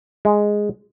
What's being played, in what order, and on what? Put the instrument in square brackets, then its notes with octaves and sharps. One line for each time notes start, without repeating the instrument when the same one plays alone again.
[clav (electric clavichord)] G#3